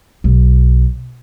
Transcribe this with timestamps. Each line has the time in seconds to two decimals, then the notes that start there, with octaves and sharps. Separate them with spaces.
0.24 B1